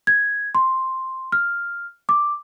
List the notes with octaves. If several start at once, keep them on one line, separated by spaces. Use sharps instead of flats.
G#6
C6
F6
D6